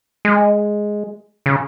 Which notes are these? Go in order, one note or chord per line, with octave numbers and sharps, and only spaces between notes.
G#3
C#3